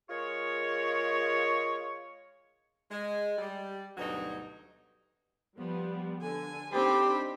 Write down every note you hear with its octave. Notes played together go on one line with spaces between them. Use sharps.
G#3 F4 G#4 A#4 C#5
G#3
G3
D2 G2 B2 F#3 D#4
F3 G3 B3
D3 G#5
C4 D4 D#4 G4 C5 B5